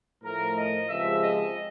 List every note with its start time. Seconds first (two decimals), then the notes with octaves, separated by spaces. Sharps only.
0.23 A2 F3 A3 A#4
0.56 D#5
0.89 C#2 C3 F3 G#3 E5
1.22 D#5